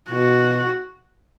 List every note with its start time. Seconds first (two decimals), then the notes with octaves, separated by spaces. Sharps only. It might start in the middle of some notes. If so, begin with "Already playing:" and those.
0.11 B2 F#4